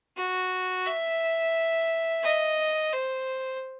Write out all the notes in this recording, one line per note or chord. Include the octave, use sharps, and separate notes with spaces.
F#4
E5
D#5
C5